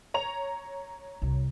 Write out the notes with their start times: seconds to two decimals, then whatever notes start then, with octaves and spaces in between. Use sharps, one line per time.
0.14 C#5 A#5 F7
1.22 C2